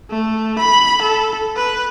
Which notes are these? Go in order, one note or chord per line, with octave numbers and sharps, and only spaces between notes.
A3
B5
A4
B4